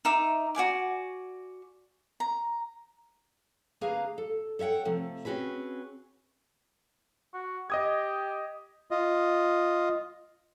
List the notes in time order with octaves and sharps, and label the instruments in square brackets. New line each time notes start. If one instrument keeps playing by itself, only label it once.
[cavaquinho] D#4 E5 D6
F#4 D5 G#5 D6
A#5
[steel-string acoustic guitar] D2 A#3 G#4 B4 F5 A#5
A4
A4 C#5 E5 F#5 G5
C3 F3 A3
C4 C#4 F#4 G#4 B4
[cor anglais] F#4
[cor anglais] G4 [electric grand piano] D#5 D#6 G#6
[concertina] F4 D#5